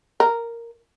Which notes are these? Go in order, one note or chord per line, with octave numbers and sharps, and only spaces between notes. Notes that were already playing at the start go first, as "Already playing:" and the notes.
A#4